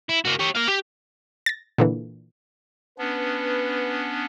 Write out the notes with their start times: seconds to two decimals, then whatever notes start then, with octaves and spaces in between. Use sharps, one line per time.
0.09 E4
0.25 A#3 F#4
0.39 G4 C#5
0.55 A#4 F5
0.68 G4
1.46 A6 A#6
1.78 A#2 D3 E3
2.99 B3 C#4 D4 B4